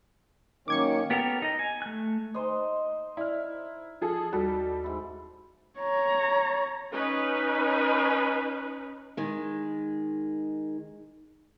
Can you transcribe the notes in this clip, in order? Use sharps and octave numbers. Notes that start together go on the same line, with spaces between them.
D#3 F#3 A#3 C#4 D6 G#6 C#7
B3 G4 A4 A#4
D#4 D#5
G#5
A3 F#6
D#4 C5 D#5
E4 D5 F6
F3 G#4 A4
D#2 G3 F#4 A4
G#2 E4
C#5 A#5
C#4 D#4 B4
D#3 G#3